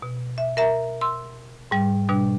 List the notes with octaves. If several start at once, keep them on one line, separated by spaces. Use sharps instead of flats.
B2
E5
A#4 E5 A#5
C6 E6
G#2 G3
B2 G3 D4